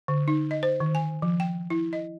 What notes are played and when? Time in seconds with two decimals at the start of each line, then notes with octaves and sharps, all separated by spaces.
0.08 D3
0.28 D#4
0.51 D#5
0.63 C5
0.80 D#3
0.95 G#5
1.22 F3
1.40 G5
1.70 E4
1.93 D#5